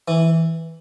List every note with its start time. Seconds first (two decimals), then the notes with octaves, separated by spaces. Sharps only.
0.08 E3